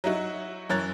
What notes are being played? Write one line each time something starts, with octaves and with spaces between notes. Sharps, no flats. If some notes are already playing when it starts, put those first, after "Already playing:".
F#3 D#4 E4 F#4
F#2 E3 A#4 C#5 F#6 A6